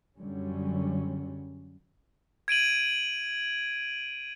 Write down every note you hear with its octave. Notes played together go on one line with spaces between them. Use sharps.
F#2 D3 F#3 G3 C#4
G#6 D7 D#7 F#7